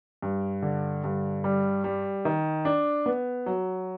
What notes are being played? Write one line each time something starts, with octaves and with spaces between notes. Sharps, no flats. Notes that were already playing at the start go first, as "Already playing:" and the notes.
G2
D3
G2
G3
G3
D#3
D4
B3
F#3